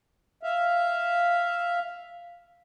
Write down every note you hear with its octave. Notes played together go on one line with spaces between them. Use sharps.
E5 F5